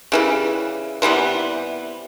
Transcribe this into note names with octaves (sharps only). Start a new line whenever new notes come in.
C#3 E3 G3
C3 E3 G3 B3